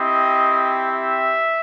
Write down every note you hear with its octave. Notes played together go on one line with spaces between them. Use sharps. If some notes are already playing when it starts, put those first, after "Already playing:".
Already playing: C4 E4 G4 D#5
E5